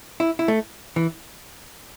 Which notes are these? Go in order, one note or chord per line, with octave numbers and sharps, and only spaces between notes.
E4
E4
A3
E3